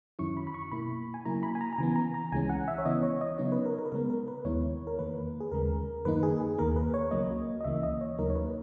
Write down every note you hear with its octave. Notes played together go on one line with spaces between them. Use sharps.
F#2 D#3 F#3 C#4 E4 C#6
B5
B5
C#6
B2 A#3 E4 B5
G#5
C#3 F#3 A#3 E4 A#5
B5
G#5
A#5
A#5
C#3 E3 B3 G#5
A#5
A#5
C#2 C#3 E3 G#3 C#4 G#5
F#5
E5
C#5
C#3 E3 B3 E4 D#5
C#5
D#5
C#3 F#3 B3 D#4 C#5
B4
A#4
A#4
B4
C#3 G#3 B3 A#4
A#4
B4
D#2 D#3 G#3 B3 E4 C#5
A#4
E2 D#3 A#3 B4
G#4
D#2 C#3 G#3 A#4
F#2 D#3 A#3 D#4 B4
G#4
G#4
D#2 D#3 A#3 A#4
B4
C#5
C#2 C#3 F#3 A#3 D#5
D#5
C#2 C#3 E3 A#3 E5
D#5
C#5
D#2 C#3 F#3 A#3 D#4 A#4
C#5
B4